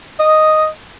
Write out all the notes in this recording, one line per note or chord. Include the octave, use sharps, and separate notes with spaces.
D#5